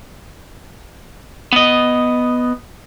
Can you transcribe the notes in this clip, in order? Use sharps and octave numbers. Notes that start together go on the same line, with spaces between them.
B3 D#5